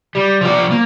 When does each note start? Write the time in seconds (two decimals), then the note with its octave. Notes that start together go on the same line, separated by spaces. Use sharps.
0.15 G3
0.41 F3 D5
0.71 A#3